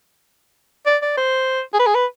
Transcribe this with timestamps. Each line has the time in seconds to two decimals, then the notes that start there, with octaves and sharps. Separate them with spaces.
0.86 D5
1.02 D5
1.17 C5
1.73 G#4
1.79 B4
1.86 G#4
1.94 B4